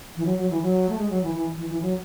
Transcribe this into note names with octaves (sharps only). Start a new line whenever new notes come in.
E3
F#3
F#3
E3
F#3
A3
G#3
F#3
E3
E3
E3
E3
F#3